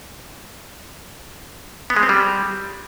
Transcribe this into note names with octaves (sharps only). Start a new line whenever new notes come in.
B3
G#3
C4
G3